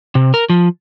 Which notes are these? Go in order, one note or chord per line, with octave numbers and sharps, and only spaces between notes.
C3
A#4
F3